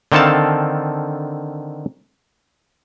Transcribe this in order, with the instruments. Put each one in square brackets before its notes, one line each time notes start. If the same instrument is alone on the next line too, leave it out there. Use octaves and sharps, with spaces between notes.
[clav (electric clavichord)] D3 D#3 C4 A4 F5 A5